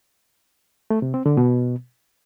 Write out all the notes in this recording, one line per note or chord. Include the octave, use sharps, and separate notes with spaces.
A3
C3
C4
D3
B2